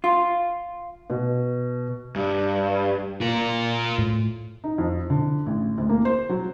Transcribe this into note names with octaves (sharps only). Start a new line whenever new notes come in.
F4
B2
G2
F4 A#4
A2
D#4
F2
D3
A1
D2
A#3
C5
F#3